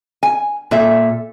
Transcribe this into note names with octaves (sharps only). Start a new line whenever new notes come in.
G#5
A#2 A4 E5